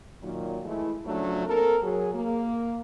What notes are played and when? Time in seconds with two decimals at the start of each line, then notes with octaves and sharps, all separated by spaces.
0.23 A#2 D#3 F#3
0.65 E3 G#3 A3 E4
1.06 C#3 F3 F#3 A3 D4
1.47 A#3 C4 A4 A#4
1.83 F#3 G#4
2.14 A#3